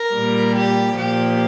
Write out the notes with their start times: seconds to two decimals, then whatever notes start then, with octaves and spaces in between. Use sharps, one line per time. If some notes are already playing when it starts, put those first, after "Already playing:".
Already playing: A#4
0.12 A#2 G3
0.55 G4
0.97 A#2 F3 G4